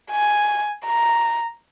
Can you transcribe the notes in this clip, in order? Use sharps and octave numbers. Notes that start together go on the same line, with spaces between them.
G#5
A#5